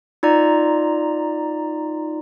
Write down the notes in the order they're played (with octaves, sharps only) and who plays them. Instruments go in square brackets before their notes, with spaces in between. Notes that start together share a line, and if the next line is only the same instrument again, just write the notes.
[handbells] D#4 F4 D5 A#5